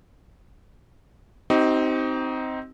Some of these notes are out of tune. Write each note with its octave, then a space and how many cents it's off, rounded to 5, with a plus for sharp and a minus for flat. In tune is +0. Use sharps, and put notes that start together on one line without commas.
C4 +0 D#4 +15 G4 -40